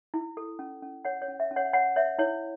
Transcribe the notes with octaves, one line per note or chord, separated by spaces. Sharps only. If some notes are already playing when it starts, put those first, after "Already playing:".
E4
A4
C#4
C#4
C#5 F#5
C#5
C#4
E5
C#4
C#5 F#5
C#5 F#5
C#5 E5
E4 C#5